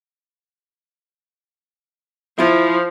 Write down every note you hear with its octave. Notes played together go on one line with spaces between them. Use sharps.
F3 E4 F4